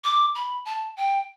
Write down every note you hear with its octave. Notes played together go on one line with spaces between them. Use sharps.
D6
B5
A5
G5